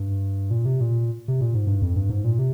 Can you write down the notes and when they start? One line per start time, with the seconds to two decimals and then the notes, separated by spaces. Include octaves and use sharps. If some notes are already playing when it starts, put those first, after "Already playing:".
Already playing: G2
0.50 A#2
0.65 C3
0.80 A#2
1.28 C3
1.41 A#2
1.54 G#2
1.67 G2
1.82 F2
1.96 G2
2.10 G#2
2.24 A#2
2.39 C3